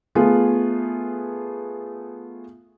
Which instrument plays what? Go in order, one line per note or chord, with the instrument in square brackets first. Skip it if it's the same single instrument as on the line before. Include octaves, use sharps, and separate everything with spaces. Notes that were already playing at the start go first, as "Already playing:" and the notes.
[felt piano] A3 B3 F4 G#4